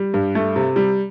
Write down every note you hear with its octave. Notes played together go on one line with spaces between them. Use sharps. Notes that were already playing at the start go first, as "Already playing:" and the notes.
Already playing: G3
G2
A3
C3
G3